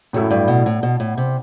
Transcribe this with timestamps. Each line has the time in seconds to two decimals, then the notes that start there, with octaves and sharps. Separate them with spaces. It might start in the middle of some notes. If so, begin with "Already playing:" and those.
0.13 F#2 A2 F#3 A3 E4
0.31 G2
0.48 B2
0.66 A2
0.83 B2
1.00 A2
1.17 C3